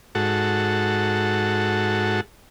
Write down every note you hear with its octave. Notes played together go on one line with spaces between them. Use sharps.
G#2 F#4 A4